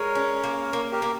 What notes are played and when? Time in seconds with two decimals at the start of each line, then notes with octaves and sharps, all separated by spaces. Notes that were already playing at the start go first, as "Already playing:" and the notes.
Already playing: G#3 A#4 C#5
0.15 C#4
0.44 A#3
0.73 A#3
0.92 G4 A#4
1.02 A#3